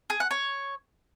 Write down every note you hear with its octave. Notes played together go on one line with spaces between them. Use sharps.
G#4
F#5
C#5